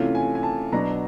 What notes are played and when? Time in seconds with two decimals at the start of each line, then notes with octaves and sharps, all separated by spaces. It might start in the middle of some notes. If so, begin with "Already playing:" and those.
Already playing: C3 E3 A3 C#4 F4
0.15 G#5
0.35 G#5
0.43 A5
0.72 B2 F#3 B3 D4 A#5